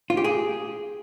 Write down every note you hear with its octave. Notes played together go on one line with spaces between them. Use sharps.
F4
G4
G#4